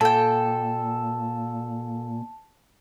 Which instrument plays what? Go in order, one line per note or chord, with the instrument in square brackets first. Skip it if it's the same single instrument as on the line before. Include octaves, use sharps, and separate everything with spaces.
[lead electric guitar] A#2 [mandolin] A4 G5 [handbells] A5